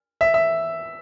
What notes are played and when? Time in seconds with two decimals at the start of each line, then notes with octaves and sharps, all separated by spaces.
0.21 E5
0.34 E5